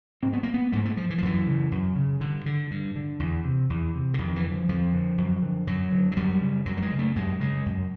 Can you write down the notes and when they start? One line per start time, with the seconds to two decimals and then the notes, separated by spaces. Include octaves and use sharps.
0.23 G#2 C4
0.33 B3
0.43 A#3
0.54 B3
0.72 G#2 A3
0.85 A3
0.97 F3
1.10 E3
1.18 F3
1.22 F#2 E3
1.47 C#3
1.71 F#2
1.96 C#3
2.20 G2 D3
2.46 D3
2.71 G2
2.96 D3
3.19 E2
3.44 C3
3.70 E2
3.94 C3
4.14 D3
4.18 F2 D#3
4.36 E3
4.44 D3
4.51 F3
4.69 F2 F3
4.93 D3
5.18 F#2
5.42 D3
5.67 F#2 F#3
5.92 D3
6.12 F#3
6.17 F#2 G3
6.41 C#3
6.66 F#2 F#3
6.77 G3
6.82 G#3
6.92 C#3
6.99 A3
7.16 F#2 G#3
7.40 C#3 G#3
7.66 F#2